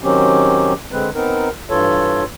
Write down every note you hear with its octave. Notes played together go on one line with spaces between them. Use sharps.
D#3 F#3 C4 C#4 G4
D3 G#3 C4 B4
B3 C4 D#4 A#4
G2 E3 F4 A4 C#5